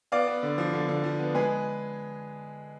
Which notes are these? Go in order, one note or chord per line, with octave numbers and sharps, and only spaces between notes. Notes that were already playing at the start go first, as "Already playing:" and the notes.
B3 D5 F5
B3
D3
F3
D3
D3
F3
B3
G#3 G#4 B4